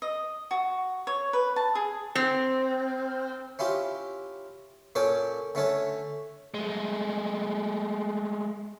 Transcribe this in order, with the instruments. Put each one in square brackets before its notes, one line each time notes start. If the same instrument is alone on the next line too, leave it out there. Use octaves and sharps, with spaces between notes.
[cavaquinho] D#5
F#4
C#5
B4
A5
G#4
[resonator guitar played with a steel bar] C4
[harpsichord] C#4 E4 F4 G4
A#2 C#4 A4 C#5 D5 G5
D3 A3 C#4 A4 C#5
[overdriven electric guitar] G#3 A3